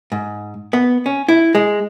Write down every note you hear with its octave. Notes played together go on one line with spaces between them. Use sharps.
G#2
B3
C#4
E4
G#3